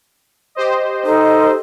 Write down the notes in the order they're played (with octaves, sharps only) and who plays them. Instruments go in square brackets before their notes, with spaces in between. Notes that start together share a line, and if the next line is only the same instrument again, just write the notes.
[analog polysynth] G4 C5 D#5
[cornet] D#4 [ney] A4